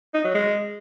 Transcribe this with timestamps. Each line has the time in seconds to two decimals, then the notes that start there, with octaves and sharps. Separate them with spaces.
0.14 D#4
0.24 F#3
0.34 G#3